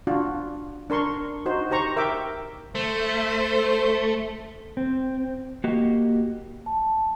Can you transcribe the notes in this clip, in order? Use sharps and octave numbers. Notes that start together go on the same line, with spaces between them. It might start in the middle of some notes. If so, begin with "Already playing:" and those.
D4 F4 F#4
D4 A#4 C6 C#6
D#4 F#4 C5
G4 C5 A#5 C#6
A#4 E5 G5 D6
A3 C5
C4
A#3 F#4 G4 D#5
A5